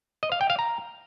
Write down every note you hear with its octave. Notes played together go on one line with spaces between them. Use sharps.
D#5
F5
G5
F5
A#5